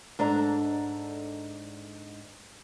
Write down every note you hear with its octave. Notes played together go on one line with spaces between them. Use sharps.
G#2 D4 A4 A#5